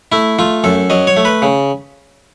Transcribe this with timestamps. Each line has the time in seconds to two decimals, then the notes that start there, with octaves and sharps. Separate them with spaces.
0.12 A3 E4
0.39 A3 F4
0.64 F#2 A4
0.90 F#3 D#5
1.07 C#5
1.17 A3
1.25 B4
1.42 C#3